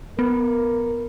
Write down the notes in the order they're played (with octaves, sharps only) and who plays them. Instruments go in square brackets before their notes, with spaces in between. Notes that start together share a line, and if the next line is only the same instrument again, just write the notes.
[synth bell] B3 [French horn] A#4